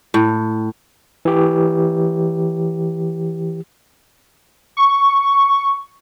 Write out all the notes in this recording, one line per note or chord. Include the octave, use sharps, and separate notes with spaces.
A2
E3 G4
C#6